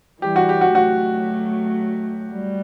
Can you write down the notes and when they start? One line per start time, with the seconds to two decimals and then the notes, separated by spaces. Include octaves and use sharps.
0.22 E3 G3 G4
0.36 F#4
0.49 G4
0.61 F#4
0.75 F#3 A3 F#4
2.33 G3